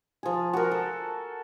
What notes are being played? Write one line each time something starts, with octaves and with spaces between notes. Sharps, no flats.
F3 G#4
F#4 A#4
A4